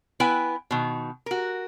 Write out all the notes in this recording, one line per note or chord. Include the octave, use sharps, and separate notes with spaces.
B3 E4 B4 G5 G#5
B2 D#3
F#4 A#4